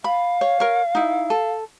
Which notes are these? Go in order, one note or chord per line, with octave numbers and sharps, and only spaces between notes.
F5 B5
C#5
A#4 C#5
D#4 E4
A4